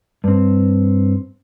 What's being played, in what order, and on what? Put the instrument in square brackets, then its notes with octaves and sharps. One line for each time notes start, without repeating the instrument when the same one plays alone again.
[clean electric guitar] G2 C4